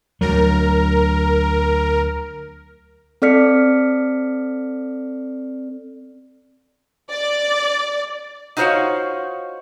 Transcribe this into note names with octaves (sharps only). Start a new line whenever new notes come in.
D2 F#3 A#4
C4 A4 D5 F6 B6 C#7
D5
D#4 F4 F#4 C5 C#5 F5